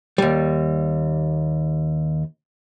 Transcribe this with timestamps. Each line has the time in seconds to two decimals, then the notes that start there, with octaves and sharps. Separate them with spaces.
0.18 D#2 G3